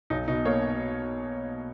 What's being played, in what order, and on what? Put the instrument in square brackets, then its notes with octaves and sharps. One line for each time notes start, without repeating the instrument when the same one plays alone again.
[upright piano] B1 [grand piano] D#4
[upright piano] B2 [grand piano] D#4
[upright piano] A#3 [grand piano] C#5
[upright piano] D#4